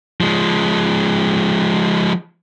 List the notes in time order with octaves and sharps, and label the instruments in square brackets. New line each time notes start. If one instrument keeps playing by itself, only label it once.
[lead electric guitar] F3 G#3